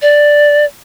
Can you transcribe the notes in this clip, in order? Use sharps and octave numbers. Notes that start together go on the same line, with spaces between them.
D5